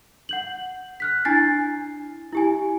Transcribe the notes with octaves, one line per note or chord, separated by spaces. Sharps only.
F#5 G6 F#7
F6 F#6 B6
D4 E4 G#5 A6 C7
E4 G4 G#5